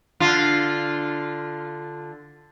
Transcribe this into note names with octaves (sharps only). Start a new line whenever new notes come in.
D3 F4